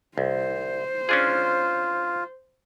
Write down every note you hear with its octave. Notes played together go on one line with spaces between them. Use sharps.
C2 C5
C#4 D4 F4 G#4